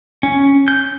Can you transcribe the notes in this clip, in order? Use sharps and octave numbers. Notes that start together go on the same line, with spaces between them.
C#4
G6